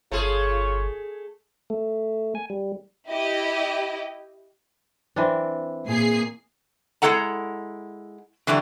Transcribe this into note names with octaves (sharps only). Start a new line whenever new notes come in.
G1 A3 F4 G#4 C#5
A3
G#5
G3
E4 G4 D#5
E3 C4 D4
A#2 G#4 C7
G#3 C4 E4 A4 F#5 A#5
D3 E3 F#3 G3 D4